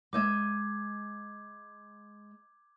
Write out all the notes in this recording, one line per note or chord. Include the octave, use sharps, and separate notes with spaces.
G#3 D#5 E5 D6 G6 G#6